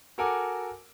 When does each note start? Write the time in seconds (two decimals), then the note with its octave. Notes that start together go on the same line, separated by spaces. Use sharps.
0.18 F#4 A4 A#4 F#5 G#5 D6